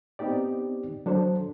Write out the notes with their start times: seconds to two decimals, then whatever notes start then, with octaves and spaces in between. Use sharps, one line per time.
0.19 B3 C4 D#4 G4 D5
1.06 F#3 D4 A4 C5